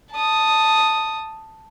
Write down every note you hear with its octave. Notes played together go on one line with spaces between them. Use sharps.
A5 D#6